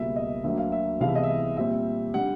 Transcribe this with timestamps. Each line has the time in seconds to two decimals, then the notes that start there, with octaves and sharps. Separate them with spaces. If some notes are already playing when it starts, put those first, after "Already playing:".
Already playing: C#2 B2 G3 A#3 E5
0.16 D#5
0.44 D2 D3 F#3 A#3 E5
0.57 F5
0.72 E5
1.00 C2 C3 E3 G#3 B3 F5
1.08 E5
1.15 D#5
1.23 E5
1.57 A#2 G3 C4 E5
2.14 D3 G3 F#5